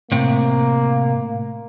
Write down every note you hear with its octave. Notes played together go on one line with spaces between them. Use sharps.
A2 C3 A#3